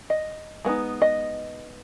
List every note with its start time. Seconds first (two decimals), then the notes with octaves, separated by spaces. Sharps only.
0.10 D#5
0.65 G#3 B3 D#4
1.02 D#5